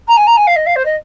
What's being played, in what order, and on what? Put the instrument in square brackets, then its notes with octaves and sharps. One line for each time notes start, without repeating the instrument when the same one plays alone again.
[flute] A#5
G#5
A#5
G#5
F5
D#5
F5
C5
D#5